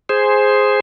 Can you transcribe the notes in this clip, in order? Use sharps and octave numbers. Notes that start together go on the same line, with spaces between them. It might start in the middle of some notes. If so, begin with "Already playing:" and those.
G#4 C5